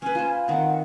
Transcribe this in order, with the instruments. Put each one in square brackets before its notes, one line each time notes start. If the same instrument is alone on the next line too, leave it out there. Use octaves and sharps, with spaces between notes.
[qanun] C#4 B4 [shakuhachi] G#5
[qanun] F4 B4 C5
[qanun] D#3 C4 [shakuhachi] F#5